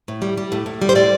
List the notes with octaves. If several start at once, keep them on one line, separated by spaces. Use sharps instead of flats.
A2
G3
G3
A2
A2
G3
C5
A2 D5